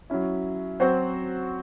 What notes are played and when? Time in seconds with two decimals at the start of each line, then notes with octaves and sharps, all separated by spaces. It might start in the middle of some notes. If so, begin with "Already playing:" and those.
0.10 F#3 C#4 E4
0.80 F#3 C4 F#4 C5